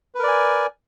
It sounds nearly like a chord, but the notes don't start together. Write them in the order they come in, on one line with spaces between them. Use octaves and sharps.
B4 A#4 D5 G#5